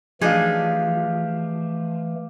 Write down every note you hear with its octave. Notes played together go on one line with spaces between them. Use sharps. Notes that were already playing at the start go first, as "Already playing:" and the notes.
E3 F3 A3 D4 D#4 G4 G#4 F5